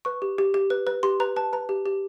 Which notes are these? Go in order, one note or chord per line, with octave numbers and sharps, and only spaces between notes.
B4 C#6
G4
G4
G4
B4
B4
G4 C6
B4 A#5
B4 A5
B4 A#5
G4
G4